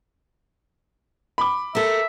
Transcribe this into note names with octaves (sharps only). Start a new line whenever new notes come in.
B5 D6
A4 A#4 E5